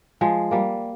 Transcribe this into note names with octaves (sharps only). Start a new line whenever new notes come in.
F3 G#3
G3 A#3